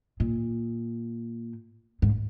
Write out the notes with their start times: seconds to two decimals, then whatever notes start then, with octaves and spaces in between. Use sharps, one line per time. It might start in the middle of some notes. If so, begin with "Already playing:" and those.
0.20 A#2
2.02 G#2